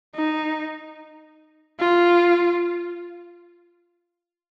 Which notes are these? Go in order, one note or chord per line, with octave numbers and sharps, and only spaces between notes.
D#4
F4